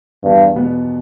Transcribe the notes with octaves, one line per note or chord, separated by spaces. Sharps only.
E2 G2
B2 B3